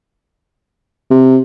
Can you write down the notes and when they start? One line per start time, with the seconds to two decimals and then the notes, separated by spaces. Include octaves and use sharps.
1.10 C3